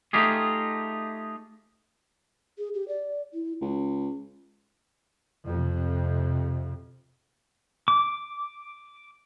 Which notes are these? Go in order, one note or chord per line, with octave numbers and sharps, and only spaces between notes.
A3 D#4 F4 G4 G#4
G#4
G4
D5
E4
C#2
F2 C3
D6